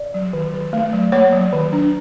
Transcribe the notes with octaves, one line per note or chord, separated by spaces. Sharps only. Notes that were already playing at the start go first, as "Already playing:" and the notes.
Already playing: D5
F#3
D#3
D#3
A3
F#3
A#3 C#5
F#3
D#3
D4